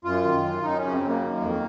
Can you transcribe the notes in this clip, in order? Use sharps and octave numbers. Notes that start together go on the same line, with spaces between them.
F#2 F4
D#3
F#2
F#2 D#4
C#3 C#4
C4
F#2
A#3
D#3
F2